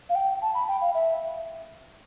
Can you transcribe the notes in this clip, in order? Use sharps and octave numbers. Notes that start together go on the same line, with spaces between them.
F5
G5
A5
B5
G5
F5
E5